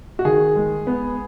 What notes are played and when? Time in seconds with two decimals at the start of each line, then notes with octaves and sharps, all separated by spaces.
0.19 F#4
0.25 D#3 G#4
0.56 G#3
0.87 B3